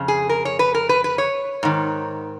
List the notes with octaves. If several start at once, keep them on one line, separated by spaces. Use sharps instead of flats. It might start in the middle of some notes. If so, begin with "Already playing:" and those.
Already playing: F2 C#3
G#4
A#4
C#5
B4
A#4
B4
B4
C#5
G#2 D#3